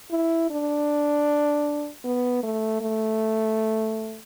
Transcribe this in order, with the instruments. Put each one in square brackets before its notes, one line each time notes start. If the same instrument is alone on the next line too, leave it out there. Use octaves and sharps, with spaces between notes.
[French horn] E4
D4
B3
A3
A3